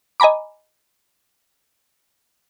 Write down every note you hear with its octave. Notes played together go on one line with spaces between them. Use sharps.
D#5 G#5 A#5 B5 D6